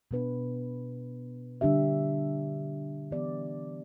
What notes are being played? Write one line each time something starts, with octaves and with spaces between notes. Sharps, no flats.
B2 B3 D4 B4
D3 G3 D4 G4 E5
E3 B3 G4 D5